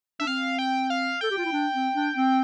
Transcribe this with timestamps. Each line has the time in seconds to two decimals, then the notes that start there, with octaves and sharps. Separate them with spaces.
0.20 D4 E5
0.26 C4 F5
0.59 G5
0.90 F5
1.21 A4 G5
1.31 G4
1.38 F4
1.45 E4
1.52 D4
1.74 C4
1.95 D4
2.15 C4